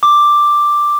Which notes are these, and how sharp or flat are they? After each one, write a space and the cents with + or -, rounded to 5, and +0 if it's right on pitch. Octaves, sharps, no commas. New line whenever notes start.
D6 +5